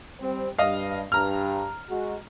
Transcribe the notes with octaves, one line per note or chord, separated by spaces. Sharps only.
G3 C4
G2 D#5 F5
G2 A#5 F6
G#3 F#4